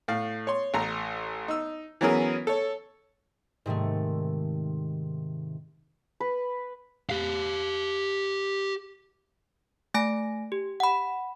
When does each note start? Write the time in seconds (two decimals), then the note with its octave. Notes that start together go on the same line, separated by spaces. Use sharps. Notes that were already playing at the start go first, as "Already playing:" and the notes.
0.08 A2 F5
0.47 C#5 C6
0.74 A1 A#5
1.48 D#4 E6
2.01 E3 F#3 B3 C#4 G#4 A#4
2.47 A4 C#5
3.66 G#2 C3 D#3 A3
6.20 B4
7.10 G4 F5
9.94 A3 G#5 A#6 D7
10.52 G4
10.80 F#5 B5